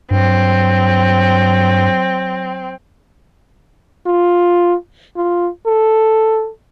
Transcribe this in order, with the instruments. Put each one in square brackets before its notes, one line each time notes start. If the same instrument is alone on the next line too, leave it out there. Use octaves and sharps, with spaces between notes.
[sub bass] G2 [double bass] F#3 [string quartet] C4
[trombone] F4
F4
A4